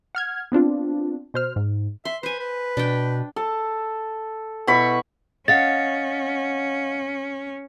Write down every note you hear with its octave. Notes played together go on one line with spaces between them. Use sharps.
F#5 F6 G#6
B3 C4 D4 F4
B2 C5 F6
G#2
E5 C6
B4 C5 G#5
B4
B2 D4 G5
A4
B2 E4 B5 C#6
C#4 D#5 F5 F#5 A6